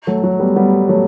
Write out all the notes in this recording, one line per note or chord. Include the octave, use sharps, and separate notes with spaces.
F#3 A3
F#3 A3
G3 B3
G3 B3
F#3 A3